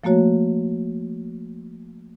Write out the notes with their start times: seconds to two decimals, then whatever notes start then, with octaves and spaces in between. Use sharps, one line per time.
0.04 F3 A3 A#3 F#4 C#5